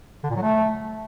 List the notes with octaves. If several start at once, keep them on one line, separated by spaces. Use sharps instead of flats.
D3
A#2
F#3
A3